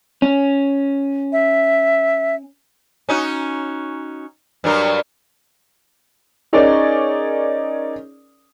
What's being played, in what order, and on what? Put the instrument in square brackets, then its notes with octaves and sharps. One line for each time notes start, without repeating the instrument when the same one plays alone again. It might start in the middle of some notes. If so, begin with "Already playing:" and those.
[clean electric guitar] C#4
[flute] E5
[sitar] C#4 D#4 F#4
G2 F#3 A#4
[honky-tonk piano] C#4 D#4 G#4 A#4 C#5 D5